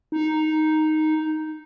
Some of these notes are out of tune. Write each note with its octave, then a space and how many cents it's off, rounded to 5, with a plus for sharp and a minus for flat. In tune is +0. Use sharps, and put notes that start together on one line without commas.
D#4 +0